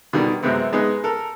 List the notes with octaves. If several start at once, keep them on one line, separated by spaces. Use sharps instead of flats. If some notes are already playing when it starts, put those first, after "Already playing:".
B2 D3 D#3 G3
F#2 C3 G#3 B3 C4
G#3 B3 D#4 G#4
A4 A#4